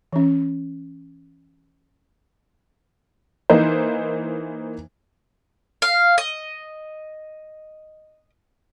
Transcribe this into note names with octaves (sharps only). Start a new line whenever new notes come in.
E3 C#4
E3 A#3 D#4 C5
F5
D#5